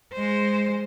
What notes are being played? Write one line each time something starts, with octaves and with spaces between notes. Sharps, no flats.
G#3 C5